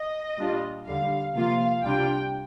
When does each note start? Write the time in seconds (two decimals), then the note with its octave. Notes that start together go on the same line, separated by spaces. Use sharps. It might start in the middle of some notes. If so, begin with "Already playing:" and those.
Already playing: D#5
0.38 A#2 G3 D4 F4
0.87 D#2 D3 G3 F5
1.35 C3 F3 A#3 F4 F5
1.83 C2 C3 G3 D4 F4 G5